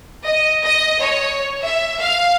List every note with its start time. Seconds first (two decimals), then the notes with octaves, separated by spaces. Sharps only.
0.25 D#5
0.64 D#5
1.01 C#5
1.64 E5
2.00 F5